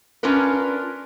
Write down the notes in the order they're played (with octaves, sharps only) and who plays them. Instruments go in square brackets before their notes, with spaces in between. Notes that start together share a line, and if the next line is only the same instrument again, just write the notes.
[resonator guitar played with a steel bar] C#4 D4 F4 A#4 B4